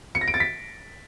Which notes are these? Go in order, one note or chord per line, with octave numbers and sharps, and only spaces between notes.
C#7
A#6
D7
A6
B6